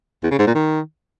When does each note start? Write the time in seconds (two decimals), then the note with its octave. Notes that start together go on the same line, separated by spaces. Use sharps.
0.23 E2
0.31 C#3
0.39 G#2
0.47 A#2
0.54 D#3